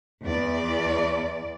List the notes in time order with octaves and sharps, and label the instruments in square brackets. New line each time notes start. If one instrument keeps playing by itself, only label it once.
[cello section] E2 D5